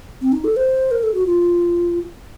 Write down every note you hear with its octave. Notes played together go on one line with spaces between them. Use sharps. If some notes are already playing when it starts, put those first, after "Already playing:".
C4
D#4
A4
C5
A#4
A4
F#4
F4